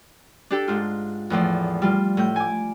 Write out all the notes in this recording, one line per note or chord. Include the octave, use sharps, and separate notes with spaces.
D4 G4 A4
G#2 F4
E2 A2 F3 D5
G3 F4
A2 G6
G#5 D6